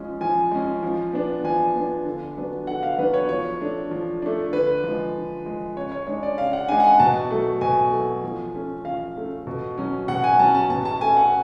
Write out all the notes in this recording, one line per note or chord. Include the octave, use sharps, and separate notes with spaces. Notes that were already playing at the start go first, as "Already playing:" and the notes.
Already playing: F3 G#3 C#4
F3 G#5
G#3 C#4
F3
B3 D4
F3 G#5
B3 D4
D3
F#3 B3 D4
D3 F#5
F5
F#3 B3 D4 B4
C#5
F3 C#5
A3 D4
F3
A3 D4
D3 B4
F3 G#3
D3
F3 G#3
C#3 C#5
C#5
G#3 D4 C#5
D5
C#3 F5
F#5
G#3 D4 G#5
F#5
G#5
B2 A5
F#3 A3
B2 G#5
F#3 A3
F3
A3 C#4
F3 F5
A3 C#4
B2
F#3 C#4
B2 F#5
G#5
F#3 C#4 A5
A5
B2 A5
A5
A3 C#4 G#5
F#5